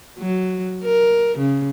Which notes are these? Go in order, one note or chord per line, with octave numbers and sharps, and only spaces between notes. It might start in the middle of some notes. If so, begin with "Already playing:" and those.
F#3
A#4
C#3